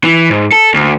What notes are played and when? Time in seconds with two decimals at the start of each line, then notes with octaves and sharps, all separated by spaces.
0.04 E3
0.31 G#2
0.53 A4
0.74 D2